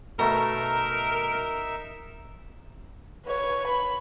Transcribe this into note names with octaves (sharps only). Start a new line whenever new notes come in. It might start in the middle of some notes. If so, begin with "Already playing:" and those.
B2 A3 D#4 A#4 E5 A#5
B4 C#5
B5